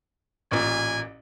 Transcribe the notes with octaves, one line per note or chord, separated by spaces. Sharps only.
A1 A#2 G#5